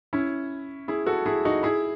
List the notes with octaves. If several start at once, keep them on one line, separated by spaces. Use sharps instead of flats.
C#4 E4
E4 G#4
F#4 A4
E4 G#4
D#4 F#4
E4 G#4